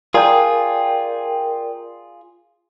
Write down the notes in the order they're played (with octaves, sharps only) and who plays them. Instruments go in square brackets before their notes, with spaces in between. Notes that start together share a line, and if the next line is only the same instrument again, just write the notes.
[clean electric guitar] F4 G#4 [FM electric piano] A#4 D5 G5